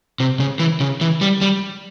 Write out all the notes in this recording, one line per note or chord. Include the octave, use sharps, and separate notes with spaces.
C3
C#3
E3
C#3
E3
G3
G3